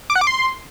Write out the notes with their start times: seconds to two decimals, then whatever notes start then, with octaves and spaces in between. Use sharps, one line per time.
0.10 D6
0.16 F#5
0.21 D6
0.27 C6